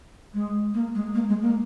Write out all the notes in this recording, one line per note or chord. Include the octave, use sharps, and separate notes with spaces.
G#3
A#3
G#3
A#3
G#3
A#3